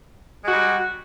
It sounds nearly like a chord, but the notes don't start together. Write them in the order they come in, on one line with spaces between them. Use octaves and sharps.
G#3 F#4 G3